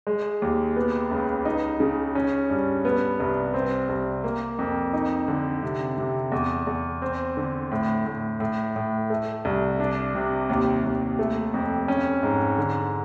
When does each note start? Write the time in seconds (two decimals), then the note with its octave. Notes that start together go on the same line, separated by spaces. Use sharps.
0.07 G#3
0.42 D#2
0.76 B3
1.11 C#2
1.45 D#4
1.80 C#3
2.15 C#4
2.50 G2
2.85 B3
3.20 C2
3.54 C4
3.89 C2
4.24 A#3
4.59 F2
4.93 D#4
5.28 D3
5.63 C3
5.98 C3
6.32 E2
6.67 E2
7.02 C4
7.37 D3
7.71 A2
8.06 A2
8.40 A2
8.76 A2
9.10 A3
9.45 C2
9.80 D4
10.15 C3
10.49 D#2
10.85 D#2
11.19 A3
11.54 F2
11.88 C#4
12.23 G#2
12.58 D3